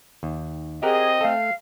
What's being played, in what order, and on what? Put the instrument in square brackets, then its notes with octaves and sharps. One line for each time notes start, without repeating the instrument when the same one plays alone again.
[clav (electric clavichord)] D#2
[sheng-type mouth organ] C4 [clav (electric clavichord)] G4 A#4 F#5 [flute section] G#4 [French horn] D#5
[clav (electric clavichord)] A3 A4 [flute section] F5